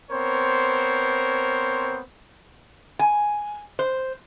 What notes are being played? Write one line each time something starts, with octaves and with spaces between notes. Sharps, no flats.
B3 C4 A#4 C5 C#5
G#5
C5